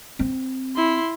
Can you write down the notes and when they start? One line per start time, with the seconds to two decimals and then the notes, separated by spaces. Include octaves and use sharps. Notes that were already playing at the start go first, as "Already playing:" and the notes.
0.19 C4
0.76 E4 C6